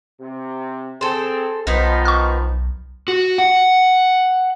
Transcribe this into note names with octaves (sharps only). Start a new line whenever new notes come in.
C3
C4 G#4 A4 C5
B1 D#3 F3 B3 D#4
C#6 F6
F#4
F#5